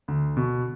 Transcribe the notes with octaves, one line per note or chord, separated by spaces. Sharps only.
D2
B2